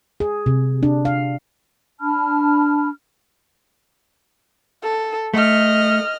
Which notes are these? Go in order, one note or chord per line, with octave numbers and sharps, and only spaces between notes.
G#4
C3
D4
F5
D4 A5 B5 F6
A4
A3 D#5 F6